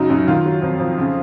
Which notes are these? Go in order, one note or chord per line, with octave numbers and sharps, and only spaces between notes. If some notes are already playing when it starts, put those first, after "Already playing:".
Already playing: F#2 C#3 F#3 D#4
F#2
D#3 F4
F#3
F2
F2
C#3